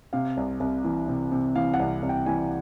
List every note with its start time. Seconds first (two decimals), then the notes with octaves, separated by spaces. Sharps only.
0.13 C3 F5
0.37 C2
0.60 C2
0.84 E3
1.08 C3
1.32 C3
1.56 E3 F5
1.74 F#5
1.79 C2
2.03 C2
2.09 G5
2.26 E3 G#5